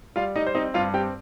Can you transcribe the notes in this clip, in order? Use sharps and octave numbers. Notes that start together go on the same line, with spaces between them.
G3 F4 F5
G3 D#4 D#5
C5
C4 D#4 D#5
G2 F4 F5
C4 G4 G5